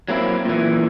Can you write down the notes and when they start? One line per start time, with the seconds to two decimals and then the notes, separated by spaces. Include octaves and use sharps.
0.08 F#3 A#3 C4 E4
0.45 A#2 E3